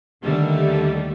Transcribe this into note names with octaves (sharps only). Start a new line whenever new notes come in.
D#2 D3 D#3 G3 A3